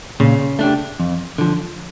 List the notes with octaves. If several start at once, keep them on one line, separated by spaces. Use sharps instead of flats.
A#2 C#3
A3 D4 G4
F2
D3 F3